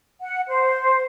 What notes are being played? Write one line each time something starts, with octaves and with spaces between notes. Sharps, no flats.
F#5
C5